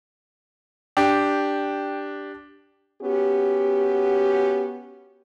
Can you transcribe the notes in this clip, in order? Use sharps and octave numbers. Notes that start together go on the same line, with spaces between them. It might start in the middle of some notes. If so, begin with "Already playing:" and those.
D4 G4 G5
B3 C#4 F#4 G4